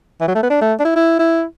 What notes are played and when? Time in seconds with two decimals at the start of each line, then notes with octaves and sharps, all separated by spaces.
0.21 E3
0.28 F#3
0.35 A3
0.43 B3
0.50 D4
0.61 A3
0.80 D4
0.85 E4
0.96 E4
1.19 E4